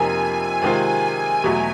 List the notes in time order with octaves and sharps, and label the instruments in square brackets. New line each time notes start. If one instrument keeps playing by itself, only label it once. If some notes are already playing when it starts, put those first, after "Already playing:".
Already playing: [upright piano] F2 C3 F3 A#3 D#4 [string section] G#5
[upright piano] C3 D#3 G#3 C4 F4
E2 B2 F#3 A3